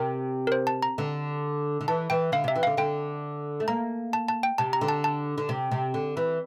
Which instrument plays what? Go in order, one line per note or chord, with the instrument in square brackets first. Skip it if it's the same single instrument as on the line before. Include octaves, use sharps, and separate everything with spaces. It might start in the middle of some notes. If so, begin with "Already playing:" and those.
Already playing: [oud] C3 [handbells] A#4
[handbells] A#4
C5
A5
A#5
[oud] D3
D3
[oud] E3 [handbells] A5
[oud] E3 [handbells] G5
[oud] D3 [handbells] F5
[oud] C3 [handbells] E5
[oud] E3
[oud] D3 [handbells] F5
[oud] D3 [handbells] G5
[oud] A3
[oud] A#3 [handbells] A#5
[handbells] A5
A5
G5
[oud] C3 [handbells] A5
[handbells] A#5
[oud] D3
[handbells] A5
A5
[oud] D3
C3
C3
D3
E3